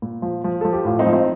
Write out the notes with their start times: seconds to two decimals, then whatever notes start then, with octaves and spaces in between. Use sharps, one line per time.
0.02 A#2
0.22 F3
0.44 F3
0.61 F3 A4
0.73 G4
0.85 A2 F4
0.99 C4 D#4
1.06 F3
1.13 C4 D#4